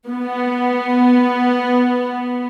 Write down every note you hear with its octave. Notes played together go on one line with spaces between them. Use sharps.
B3